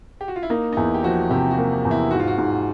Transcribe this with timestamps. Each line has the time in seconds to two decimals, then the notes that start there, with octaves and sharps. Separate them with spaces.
0.21 G4
0.28 F#4
0.36 F4
0.43 E4
0.50 A#3 D#4
0.73 D#4
0.77 E2 E4
0.94 G4
1.04 F3 F#4
1.30 C3 G4
1.51 F#4
1.58 A#3
1.85 E2
1.91 E4
2.11 G#2 F#4
2.20 F4
2.27 F#4
2.38 G#2